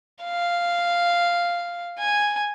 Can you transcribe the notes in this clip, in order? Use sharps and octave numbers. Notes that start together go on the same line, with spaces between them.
F5
G#5